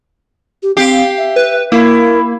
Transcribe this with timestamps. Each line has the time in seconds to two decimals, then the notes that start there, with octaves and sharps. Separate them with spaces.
0.62 G4
0.77 C4 G4 F5
1.18 E5
1.36 B4
1.72 A#3 E4 A#4